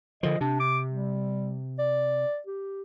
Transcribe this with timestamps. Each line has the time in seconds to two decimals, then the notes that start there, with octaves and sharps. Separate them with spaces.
0.23 D3 F3 D#5
0.41 C3 D4
0.60 D6
0.91 G3
1.79 D5
2.47 G4